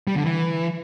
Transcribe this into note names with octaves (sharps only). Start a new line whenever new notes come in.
G3
D3
E3